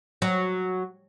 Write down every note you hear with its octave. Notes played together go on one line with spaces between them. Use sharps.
F#3